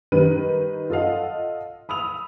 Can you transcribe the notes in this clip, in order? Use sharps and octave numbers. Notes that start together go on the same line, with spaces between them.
D#3 G3 B4 D#7
F4 A4 D#5 F5 F#5
B5 D#6 E6 F7